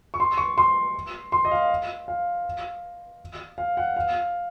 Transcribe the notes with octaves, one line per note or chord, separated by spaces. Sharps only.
C#6
C6
C#6
C6
C6
D#5
F5
F5
F5
F#5
F5